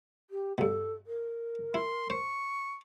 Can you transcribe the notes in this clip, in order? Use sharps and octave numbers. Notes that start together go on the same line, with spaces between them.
G4
G2 B2 A4
A#4
E4 C6
C5 C#6